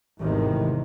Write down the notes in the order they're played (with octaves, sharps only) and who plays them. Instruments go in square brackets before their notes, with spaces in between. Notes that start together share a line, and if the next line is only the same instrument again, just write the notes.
[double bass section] G#1 E2 A2 C3 D#3